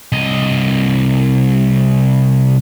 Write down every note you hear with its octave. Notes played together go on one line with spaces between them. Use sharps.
C2 D#5